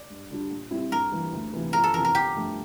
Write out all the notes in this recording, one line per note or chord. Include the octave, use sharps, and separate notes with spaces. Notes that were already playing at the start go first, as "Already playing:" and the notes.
Already playing: D5
G2
D3 G3 D4
A#2
G3 C4 E4 G4
G2 A#4
E3 G3 A#3
D2
C3 E3 A#3
G1 A#4
A4
F2 C3 E3 A#4
A#4
G1 G4
G2 F3 A3